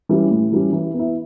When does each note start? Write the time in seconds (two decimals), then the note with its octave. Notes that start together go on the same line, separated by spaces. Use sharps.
0.09 E3 G3 C#4
0.30 A2
0.52 E3 G3 C#4
0.73 E3
0.94 B3
0.99 E4